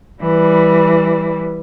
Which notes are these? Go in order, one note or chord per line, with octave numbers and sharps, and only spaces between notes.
E3 G3